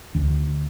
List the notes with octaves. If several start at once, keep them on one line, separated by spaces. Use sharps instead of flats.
D2